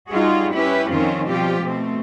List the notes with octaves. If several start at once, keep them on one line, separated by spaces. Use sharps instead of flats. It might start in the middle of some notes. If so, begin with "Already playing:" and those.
G3 D#4 F4 F#4 G#4
C#4 E4 G4 B4
F2 D#3 C4 C#4 F4
B2 F3 G3 C4 F4 G4
B2 A3 C4